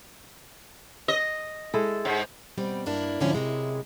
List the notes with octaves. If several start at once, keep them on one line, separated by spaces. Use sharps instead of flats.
D#5
G#3 E4 A4
G#2
B2 G3 C4
G2 A#3 D4 E4
G#2 D3 F3 C#4 E4
F#2 C3 G#3 E4